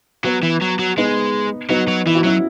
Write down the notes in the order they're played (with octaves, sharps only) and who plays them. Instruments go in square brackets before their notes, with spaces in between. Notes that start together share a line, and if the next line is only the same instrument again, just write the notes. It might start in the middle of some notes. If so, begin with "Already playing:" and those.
[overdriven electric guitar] F#3 [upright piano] B3
[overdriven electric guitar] E3
F#3
F#3
[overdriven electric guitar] G#3 [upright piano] B3 D#4
[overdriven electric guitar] F#3 [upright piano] B3 D#4
[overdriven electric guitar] F#3
[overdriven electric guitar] E3 [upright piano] E4
[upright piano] F#4
[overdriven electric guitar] F#3 [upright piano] C#4 E4